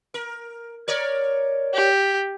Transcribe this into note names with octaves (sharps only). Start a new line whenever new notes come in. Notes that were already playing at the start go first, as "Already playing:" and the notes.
A#4
A#4 C#5 D5
G4